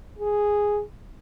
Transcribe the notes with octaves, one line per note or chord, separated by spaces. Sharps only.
G#4